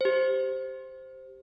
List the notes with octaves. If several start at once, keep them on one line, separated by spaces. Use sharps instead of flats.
G4 C5